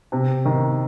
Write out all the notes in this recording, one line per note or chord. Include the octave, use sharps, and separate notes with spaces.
C3
D#3